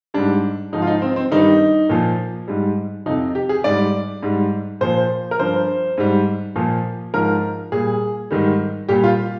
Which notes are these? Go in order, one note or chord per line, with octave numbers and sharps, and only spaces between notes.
G#2 G3 D4
G#2 F3 D#4
F4
D#4
C4
C4
G2 D#3 G3 D#4
A#2 F3
G#2 G3
F2 C3 F3 D#4
G4
G#4
G#2 G3 D5
G#2 G3
A#2 F3 C5
A#4
G2 F3 C5
G#2 G3
A#2 F3
G#2 F3 A#4
A#2 G3 G#4
G#2 D#3 G3
A#2 G3 G4
F4